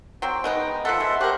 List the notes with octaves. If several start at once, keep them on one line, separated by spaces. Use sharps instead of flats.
F#3 C4 G5
G#3 B3 D#4
F3 B3 A4 E5 F#5 C6
G#3
F#4 G4 A#4 C5 F#6